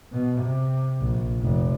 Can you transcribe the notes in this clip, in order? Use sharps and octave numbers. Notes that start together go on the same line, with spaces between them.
B2
C3
A#1
F1